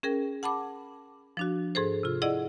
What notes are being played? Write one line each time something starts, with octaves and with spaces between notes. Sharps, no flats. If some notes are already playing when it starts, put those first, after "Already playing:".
C#4 G#4 A#4 G5
F#5 A5 B5 D6
F3 D4 F#4
G#2 G#4 A4 C5
C3 F4
E4 G#4 D5 D#5 F#5